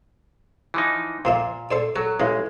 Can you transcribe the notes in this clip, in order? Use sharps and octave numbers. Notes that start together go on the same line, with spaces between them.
E3 F3 D#4
A#2 F3 A#3 E5
A4 C5 D5
F#3 A4
A1 C#3 E3 G#3